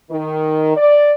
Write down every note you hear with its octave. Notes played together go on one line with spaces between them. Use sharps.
D#3
D5